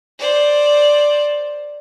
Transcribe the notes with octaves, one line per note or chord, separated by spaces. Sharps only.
C5 D5